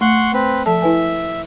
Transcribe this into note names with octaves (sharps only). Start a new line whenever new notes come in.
A3 F#5 C6 C#6
C4 B4
F3 A4 E5 A5
E4 B4 G#5